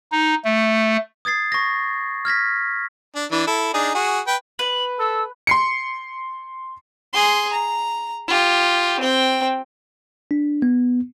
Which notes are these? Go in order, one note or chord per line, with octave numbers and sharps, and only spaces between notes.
D#4
A3
D#6 G#6 A6 C7
C#6 A#6
F6 G#6 A#6 B6
D4
E3 D4
E4 A4
D4 D#4 G#4
F#4 G#4
B4 G5
B4 F#7
A4 E6
C6 C7 C#7
G#4 C6
A#5
F4 G4
C4 G5
D4
B3